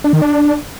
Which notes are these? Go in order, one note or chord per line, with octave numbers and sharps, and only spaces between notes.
D4
D#3
D4